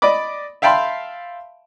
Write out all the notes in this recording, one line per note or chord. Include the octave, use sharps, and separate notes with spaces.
D5 D#5 B5 D6
E5 F5 G5 A5 B5 C6